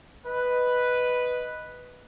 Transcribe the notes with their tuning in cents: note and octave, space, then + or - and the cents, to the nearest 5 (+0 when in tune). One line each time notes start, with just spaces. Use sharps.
B4 +0 D#5 +0